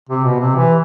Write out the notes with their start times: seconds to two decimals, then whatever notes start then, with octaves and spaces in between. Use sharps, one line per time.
0.09 C3
0.24 B2
0.40 C3
0.56 E3